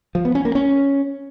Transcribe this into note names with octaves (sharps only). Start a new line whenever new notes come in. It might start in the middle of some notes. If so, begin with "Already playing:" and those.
F3
B3
C#4
A#3
C#4